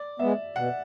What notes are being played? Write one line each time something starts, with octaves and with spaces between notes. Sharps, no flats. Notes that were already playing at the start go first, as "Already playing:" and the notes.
Already playing: D5
G#3 B3 E5
B2 F#5